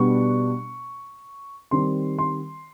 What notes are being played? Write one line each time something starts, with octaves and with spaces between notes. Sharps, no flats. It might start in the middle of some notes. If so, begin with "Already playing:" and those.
Already playing: B2 G3 B3 D4 C#6
D#3 G3 C4 C6
C6